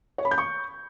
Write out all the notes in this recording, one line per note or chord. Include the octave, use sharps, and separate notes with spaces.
C#5
B5
G6
C#6